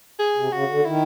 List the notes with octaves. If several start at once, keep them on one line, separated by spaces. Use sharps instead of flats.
G#4
C3
C#3 F#4
D3
D#3 E4